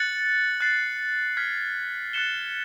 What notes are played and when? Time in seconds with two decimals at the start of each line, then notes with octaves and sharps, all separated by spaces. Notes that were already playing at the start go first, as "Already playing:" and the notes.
Already playing: F#6 A6 C#7 F#7
0.60 F#6 A6 C7
1.37 F6 G#6 B6
2.13 F#6 A6 C#7 E7 G7